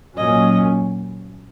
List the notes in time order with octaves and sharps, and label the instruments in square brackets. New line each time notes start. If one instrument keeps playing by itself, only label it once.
[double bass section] A#2 F#3 C#4 [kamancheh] D#5